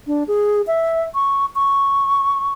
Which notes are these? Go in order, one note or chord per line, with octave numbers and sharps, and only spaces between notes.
D4
G#4
E5
C#6
C#6